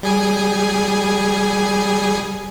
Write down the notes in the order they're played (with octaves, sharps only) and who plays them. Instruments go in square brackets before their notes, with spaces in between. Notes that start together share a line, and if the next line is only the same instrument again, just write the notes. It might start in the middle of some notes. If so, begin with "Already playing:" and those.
[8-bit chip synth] G3 G#4 G#5